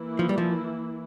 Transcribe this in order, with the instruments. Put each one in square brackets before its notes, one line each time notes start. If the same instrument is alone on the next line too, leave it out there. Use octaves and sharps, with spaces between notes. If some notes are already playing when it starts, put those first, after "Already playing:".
Already playing: [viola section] E3 A#3 E4
[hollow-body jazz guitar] F3
G3
F3